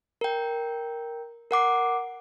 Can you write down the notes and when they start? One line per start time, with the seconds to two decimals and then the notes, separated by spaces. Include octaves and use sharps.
0.21 A#4 G5
1.51 A#4 F#5 D6 C7